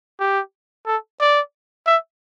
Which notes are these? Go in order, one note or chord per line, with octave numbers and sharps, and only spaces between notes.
G4
A4
D5
E5